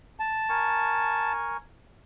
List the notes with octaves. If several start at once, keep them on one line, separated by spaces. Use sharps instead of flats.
A5
A#4 G#5 C#6